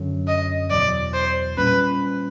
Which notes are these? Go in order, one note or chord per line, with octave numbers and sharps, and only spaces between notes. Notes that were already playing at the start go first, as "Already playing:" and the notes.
Already playing: F#2 D3 F#3
D#5
E2 B2 F#3 D5
C5
A#2 G3 A#3 C#4 B4